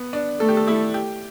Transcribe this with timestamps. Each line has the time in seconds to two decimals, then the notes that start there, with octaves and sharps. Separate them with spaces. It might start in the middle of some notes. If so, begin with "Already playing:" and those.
Already playing: B3
0.13 D4
0.40 A3 A4
0.49 G4
0.57 A4
0.67 E4
0.94 G4